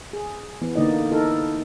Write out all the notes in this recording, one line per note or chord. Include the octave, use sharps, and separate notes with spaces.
G#4
E3 B3
D3 A#3 D#4 D5 D#5
D#4 E4 A4 A#4